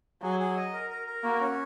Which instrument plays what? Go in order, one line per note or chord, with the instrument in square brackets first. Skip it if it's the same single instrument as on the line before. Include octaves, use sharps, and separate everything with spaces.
[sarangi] F#3 [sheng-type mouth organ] G#4
[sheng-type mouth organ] G#4
D#5
A#4
A#4
A#4
[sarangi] A#3 [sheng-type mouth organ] F#4
[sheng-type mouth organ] C#4